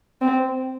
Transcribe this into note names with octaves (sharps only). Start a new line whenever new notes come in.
C4